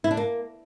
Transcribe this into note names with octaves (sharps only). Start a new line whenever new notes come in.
E4
D4
A#3